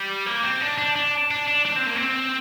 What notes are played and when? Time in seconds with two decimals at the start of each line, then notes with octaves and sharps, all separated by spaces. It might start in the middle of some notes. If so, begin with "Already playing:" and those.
Already playing: G3
0.26 A#3
0.43 C4
0.61 D4
0.78 D4
0.96 D4
1.31 D4
1.48 D4
1.65 D4
1.76 C4
1.86 A#3
1.96 C4